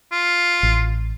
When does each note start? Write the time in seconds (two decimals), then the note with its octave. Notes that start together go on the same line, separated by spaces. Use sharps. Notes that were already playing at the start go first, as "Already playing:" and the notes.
0.12 F4
0.63 A1